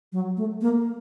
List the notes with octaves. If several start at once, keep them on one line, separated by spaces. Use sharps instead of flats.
F#3
A3
A#3